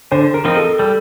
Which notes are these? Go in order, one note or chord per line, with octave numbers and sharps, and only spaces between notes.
D3 C5
A#4
F3 C4 D#4
A4
G3 A4